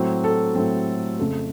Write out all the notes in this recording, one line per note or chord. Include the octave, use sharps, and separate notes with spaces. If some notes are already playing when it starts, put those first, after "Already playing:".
Already playing: A2 F#3 C4
A4
A2 F#3 C4
F2 C#3 A3